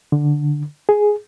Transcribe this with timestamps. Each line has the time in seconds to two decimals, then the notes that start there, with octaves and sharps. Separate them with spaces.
0.12 D3
0.89 G#4